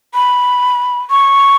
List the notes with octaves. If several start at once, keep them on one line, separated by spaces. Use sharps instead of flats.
B5
C#6